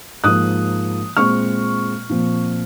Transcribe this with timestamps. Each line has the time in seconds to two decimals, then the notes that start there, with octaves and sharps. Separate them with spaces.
0.24 G#2 F3 A#3 D#6 F#6
1.17 A#2 G#3 C4 C#6 F6
2.09 A#2 F3 C4